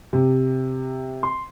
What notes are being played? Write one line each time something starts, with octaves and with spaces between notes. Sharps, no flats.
C3
C6